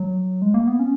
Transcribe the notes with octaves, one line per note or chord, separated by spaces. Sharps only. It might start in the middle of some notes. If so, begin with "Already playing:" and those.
Already playing: F#3
G#3
A#3
B3
C#4